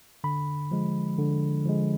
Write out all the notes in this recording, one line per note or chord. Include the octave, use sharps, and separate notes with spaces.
D3 B5
F3 G#3
D3
F3 G#3